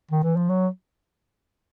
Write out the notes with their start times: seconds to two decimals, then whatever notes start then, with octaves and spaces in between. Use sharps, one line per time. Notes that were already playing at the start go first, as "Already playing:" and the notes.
0.11 D#3
0.24 E3
0.36 F3
0.50 F#3